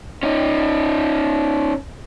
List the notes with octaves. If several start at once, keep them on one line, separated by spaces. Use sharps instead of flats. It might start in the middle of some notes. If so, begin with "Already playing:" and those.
C#4 D#4